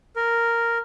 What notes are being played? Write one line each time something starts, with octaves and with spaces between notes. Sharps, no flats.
A#4